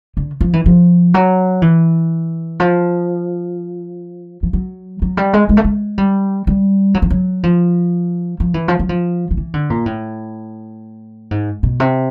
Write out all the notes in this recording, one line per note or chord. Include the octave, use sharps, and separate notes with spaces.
D3
F3
E3
F3
F#3
E3
F3
F3
F#3
F#3
G3
G#3
G#3
A3
G#3
G3
G3
F#3
F3
F#3
F3
F3
E3
F3
F#3
F3
F3
E3
D3
A#2
A2
G#2
B2
C3